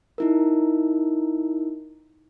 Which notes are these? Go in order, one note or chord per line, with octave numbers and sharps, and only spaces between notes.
D#4 E4 A#4